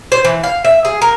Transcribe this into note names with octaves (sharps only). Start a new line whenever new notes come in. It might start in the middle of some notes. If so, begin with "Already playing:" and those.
C5
E3
F5
E5
G#4
A#4